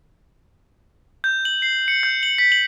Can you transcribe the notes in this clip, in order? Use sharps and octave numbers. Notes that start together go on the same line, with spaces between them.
G6
F#7
C7
C#7
G6
F#7
B6
F#7